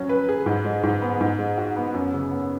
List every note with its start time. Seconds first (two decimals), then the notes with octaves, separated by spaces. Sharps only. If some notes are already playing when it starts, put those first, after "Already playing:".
Already playing: F#3 C#4
0.09 B4
0.29 G#4
0.46 G#2
0.65 G#3
0.83 G#2
1.02 B3
1.20 G#2
1.39 G#3
1.58 F#4
1.76 B3
1.94 F#2
2.13 C#3
2.31 B3